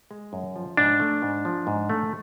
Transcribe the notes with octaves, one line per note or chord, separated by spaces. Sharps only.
G#3
F#2
F3
G#2 D4
A3
G#2
F3
G#2
A3